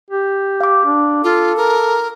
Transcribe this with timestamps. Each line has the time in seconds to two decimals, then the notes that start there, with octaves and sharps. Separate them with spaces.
0.10 G4
0.61 F5 D6
0.86 D4
1.24 F4 A4
1.57 A#4